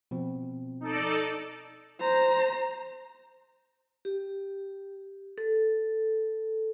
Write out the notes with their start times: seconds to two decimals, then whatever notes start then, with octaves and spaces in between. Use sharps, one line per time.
0.11 B2 F3 C4
0.80 D#4 A4 D5
2.00 C5 A#5
4.05 G4
5.38 A4